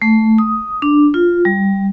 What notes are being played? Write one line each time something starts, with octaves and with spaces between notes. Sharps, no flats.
A3
D#6
D4
F4
G3